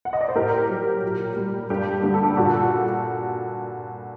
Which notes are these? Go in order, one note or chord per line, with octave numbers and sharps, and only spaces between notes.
F#5
D#5
D5
C5
A2 G4 A#4
F#3
A#2
G3
G2 G4
D3 G3 G4
A4
G4
A#2 F#4 A4